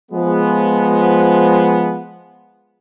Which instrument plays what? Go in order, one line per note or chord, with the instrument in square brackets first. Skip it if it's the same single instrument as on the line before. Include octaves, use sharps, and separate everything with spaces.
[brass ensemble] F3 G#3 B3